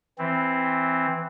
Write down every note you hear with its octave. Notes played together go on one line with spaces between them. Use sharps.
E3 C4